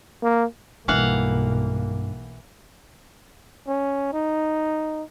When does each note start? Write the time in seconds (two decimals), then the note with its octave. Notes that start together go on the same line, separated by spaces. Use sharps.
0.23 A#3
0.88 B1 G2 E3 A#3 F5 F#5
3.68 C#4
4.13 D#4